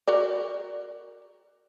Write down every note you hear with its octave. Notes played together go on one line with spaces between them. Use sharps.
F#4 A#4 D5